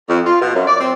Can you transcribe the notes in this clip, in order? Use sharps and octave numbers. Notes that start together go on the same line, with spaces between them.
F2
F4
B2
F#2
D5
C4